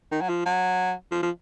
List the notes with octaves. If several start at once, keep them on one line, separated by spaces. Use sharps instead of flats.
D#3
F#3
F3
F#3
F3
F3